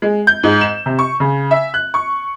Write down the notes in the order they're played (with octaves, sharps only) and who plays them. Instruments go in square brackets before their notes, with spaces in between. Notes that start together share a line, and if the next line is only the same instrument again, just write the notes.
[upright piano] G#3
G6
G#2
E7
C3
C#6
C#3
E5
F#6
C#6